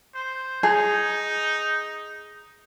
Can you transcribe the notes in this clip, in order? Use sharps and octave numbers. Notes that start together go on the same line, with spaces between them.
C5
D#4 G#4